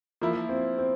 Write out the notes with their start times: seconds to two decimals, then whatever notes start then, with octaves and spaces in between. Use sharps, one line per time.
0.21 F3 A#3 E4 F4
0.49 C4
0.78 C4